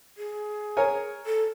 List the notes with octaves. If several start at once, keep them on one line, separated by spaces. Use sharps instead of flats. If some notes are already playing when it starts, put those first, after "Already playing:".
G#4
A#4 C#5 G#5
A4